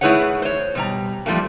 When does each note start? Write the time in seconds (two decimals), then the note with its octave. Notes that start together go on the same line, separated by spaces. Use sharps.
0.01 A3 E4 G#4 B4 C#5 F#5
0.42 C5 C#5
0.75 B2 G3 A#5
1.26 G2 F3 G3 A3 A#3